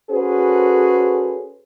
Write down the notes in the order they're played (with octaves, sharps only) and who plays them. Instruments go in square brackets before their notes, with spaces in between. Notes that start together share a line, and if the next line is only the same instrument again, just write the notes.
[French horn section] C#4 F#4 G#4 A4 B4 C5